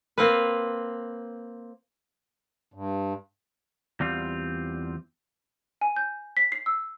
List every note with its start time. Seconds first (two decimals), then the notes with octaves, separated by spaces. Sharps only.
0.18 A#3 C4 B4
2.74 G2
4.00 E2 G3 C4 F4
5.81 G#5
5.96 G6
6.37 B6
6.52 C7
6.66 E6